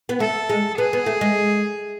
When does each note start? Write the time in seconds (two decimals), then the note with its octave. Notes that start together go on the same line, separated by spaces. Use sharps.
0.09 B3
0.20 A3 A4
0.49 G#3
0.78 B3 G#4
0.93 B3
1.06 A3
1.21 G#3